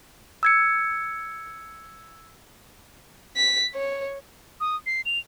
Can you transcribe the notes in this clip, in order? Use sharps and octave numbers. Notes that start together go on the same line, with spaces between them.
E6 G#6 C#7
B6
C#5
D#6
C7
F7